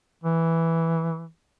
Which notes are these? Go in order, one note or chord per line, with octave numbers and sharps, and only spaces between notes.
E3